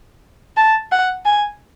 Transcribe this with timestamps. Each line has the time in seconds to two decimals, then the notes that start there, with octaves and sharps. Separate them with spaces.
0.57 A5
0.91 F#5
1.25 G#5